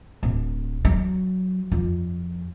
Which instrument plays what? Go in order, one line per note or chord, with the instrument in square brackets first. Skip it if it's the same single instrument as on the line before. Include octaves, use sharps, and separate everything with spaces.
[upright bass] D1
F#3
F2